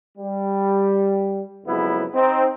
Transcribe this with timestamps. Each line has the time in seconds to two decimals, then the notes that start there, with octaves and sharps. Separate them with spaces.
0.18 G3
1.66 F2 C#3 F#3 G#3 B3 E4
2.14 C4 D#4